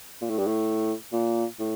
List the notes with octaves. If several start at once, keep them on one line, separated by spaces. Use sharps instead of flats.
A#2
A2
G2
A2
A#2
A2